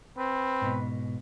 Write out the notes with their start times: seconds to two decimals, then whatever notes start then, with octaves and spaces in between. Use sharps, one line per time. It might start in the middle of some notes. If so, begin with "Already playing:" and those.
0.17 C4 B4
0.62 G#2 B2